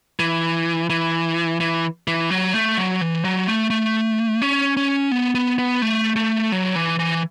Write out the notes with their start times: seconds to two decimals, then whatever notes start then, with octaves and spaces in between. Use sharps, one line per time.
0.20 E3
0.90 E3
1.60 E3
2.08 E3
2.30 F#3
2.54 A3
2.78 F#3
3.01 E3
3.25 F#3
3.47 A3
3.70 A3
4.42 C#4
4.77 C#4
5.11 B3
5.35 B3
5.59 B3
5.82 A3
6.16 A3
6.52 F#3
6.76 E3
6.99 E3